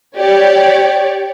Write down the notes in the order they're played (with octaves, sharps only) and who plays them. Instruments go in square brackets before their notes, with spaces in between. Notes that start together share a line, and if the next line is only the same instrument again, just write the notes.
[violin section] G4 C#5 D5